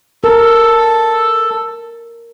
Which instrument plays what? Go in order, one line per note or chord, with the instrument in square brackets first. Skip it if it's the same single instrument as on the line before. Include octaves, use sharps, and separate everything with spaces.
[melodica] A4 [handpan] A#4